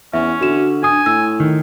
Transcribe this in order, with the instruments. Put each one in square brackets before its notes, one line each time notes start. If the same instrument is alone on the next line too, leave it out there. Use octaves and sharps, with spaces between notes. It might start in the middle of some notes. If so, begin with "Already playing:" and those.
[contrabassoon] E2 [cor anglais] C#4 [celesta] E5
[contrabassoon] D3 [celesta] F#4 E7
[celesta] D4 D#6 [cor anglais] G#5
[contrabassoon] A2 [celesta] E6
[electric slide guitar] D#3